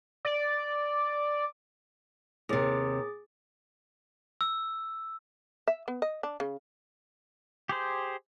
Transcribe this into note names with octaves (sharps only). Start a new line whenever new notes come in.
D5
D#2 C3 G#4 D6 A6
E6
E5
B3
D#5
D4
C#3
G4 G#4 C5